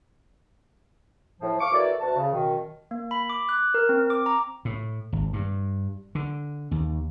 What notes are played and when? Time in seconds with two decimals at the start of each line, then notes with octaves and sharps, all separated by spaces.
1.41 A2 F3
1.60 F5 C#6 D6
1.72 E3 A#3 F#4 A4 C#5 D5
2.00 D2 F#4 A5
2.16 C#3
2.32 F#2 B2 D#3
2.91 A#3
3.11 B5
3.30 D6
3.49 F#6
3.74 A#4
3.89 C4
4.10 D6
4.26 A#5
4.65 A2
5.13 G#1
5.33 G2
6.15 D3
6.71 D#2